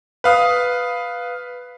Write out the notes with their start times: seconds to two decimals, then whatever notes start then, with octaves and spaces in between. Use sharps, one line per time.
0.24 B4 F5 D#6